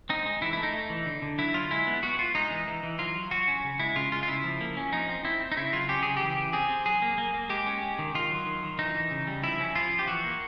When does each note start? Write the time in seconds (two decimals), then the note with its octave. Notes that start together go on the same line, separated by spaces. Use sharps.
0.09 C4 D#4
0.26 G#3
0.42 E3 E4
0.53 A3 E4
0.63 D#4
0.73 A3
0.90 E3
1.06 D3
1.22 D3
1.38 F#3 E4
1.54 F#3 F4
1.71 G#3 E4
1.87 B3
2.03 B3 F#4
2.19 B3 F4
2.35 G#3 D#4
2.51 E3
2.67 E3
2.83 E3
2.99 F#3 F4
3.16 F#3
3.31 F#3 F#4
3.48 C#4
3.64 C#3
3.80 G#3 E4
3.96 C#3 F4
4.12 G#3 F4
4.23 F4
4.28 C#3 E4
4.44 F3
4.61 A#3
4.77 C#4
4.92 F3 D#4
5.09 C4
5.25 C4 E4
5.41 C4
5.52 D#4
5.57 C#3 E4
5.73 F#3 F4
5.89 C#4 G4
6.03 C#3 G#4
6.17 E3 G4
6.37 E3
6.53 C4 G#4
6.69 C4
6.86 F#3 G#4
7.02 A#3
7.18 A#3
7.34 A#3
7.50 G#3 G4
7.66 C#4
7.83 G#3
7.99 D#3
8.14 D#3 F4
8.31 F#3
8.46 D#3
8.63 D#3
8.79 E3 D#4
8.95 E3
9.11 C#3
9.27 G3
9.43 F3 E4
9.60 C#4
9.75 F3 F4
9.92 F3
9.99 G4
10.07 E3 F#4
10.24 A#3